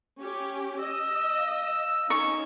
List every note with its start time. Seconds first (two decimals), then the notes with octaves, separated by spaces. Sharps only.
0.20 C#4 G4
0.80 D#5 E6
1.37 F5
2.10 C#4 D#4 C#6